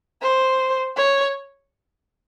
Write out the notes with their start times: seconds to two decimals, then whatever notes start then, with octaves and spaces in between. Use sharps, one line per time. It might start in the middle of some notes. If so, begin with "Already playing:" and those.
0.21 C5
0.96 C#5